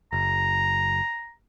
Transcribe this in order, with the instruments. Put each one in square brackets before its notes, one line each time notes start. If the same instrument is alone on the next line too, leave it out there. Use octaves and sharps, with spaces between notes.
[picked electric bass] F#1 [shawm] A#5